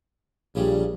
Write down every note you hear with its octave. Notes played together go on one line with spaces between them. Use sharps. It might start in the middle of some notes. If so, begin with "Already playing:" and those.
A#1 G2 C#3 G3